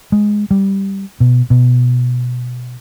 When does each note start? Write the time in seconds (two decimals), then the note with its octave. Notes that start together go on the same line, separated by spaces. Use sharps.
0.12 G#3
0.51 G3
1.20 B2
1.50 B2